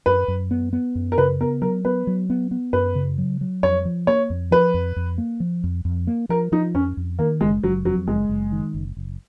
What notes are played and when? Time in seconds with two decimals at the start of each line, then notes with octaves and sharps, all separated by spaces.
0.06 F#2 B4
0.28 F#2
0.51 B3
0.73 B3
0.95 F#2
1.12 A#4
1.18 C#3 B4
1.41 B3 A#4
1.62 F#3 A#4
1.85 B3 B4
2.07 F#3
2.30 B3
2.51 B3
2.73 F#2 B4
2.95 C#3
3.18 F#3
3.41 F#3
3.63 F2 C#5
3.85 F3
4.07 A#3 C#5
4.30 F2
4.51 F3 B4
4.74 F2
4.96 F2
5.18 A#3
5.40 F3
5.64 F2
5.85 F2
6.07 A#3
6.29 F3 A#4
6.52 F3 D#4
6.74 F2 C#4
6.97 F2
7.19 D#3 A#3
7.41 F#1 G#3
7.63 F#1 F#3
7.85 F2 F#3
8.07 F#1 G#3
8.30 F#1
8.52 D#3
8.74 F#1
8.97 F#1